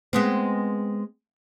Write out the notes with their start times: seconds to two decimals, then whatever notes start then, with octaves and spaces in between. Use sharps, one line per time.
0.13 G#3 B3 C4